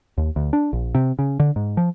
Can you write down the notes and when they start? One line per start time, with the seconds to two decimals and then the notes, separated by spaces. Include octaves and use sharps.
0.18 D#2
0.36 D2
0.53 D4
0.73 A#1
0.95 C3
1.19 C#3
1.40 D3
1.56 G#2
1.77 F3